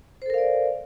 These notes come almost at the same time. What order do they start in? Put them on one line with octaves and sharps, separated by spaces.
C5 A4 A#4 F5 D5